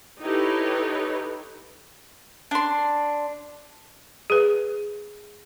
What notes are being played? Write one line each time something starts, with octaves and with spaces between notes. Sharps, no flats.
D#4 E4 G4 A4 B4 C#5
D4 C6
G#4 B4